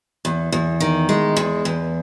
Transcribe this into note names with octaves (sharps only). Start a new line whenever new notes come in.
E2
E2
D#3
G#3
E2
E2